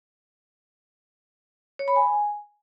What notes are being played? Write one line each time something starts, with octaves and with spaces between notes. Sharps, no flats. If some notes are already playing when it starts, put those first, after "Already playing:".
C#5
B5
G#5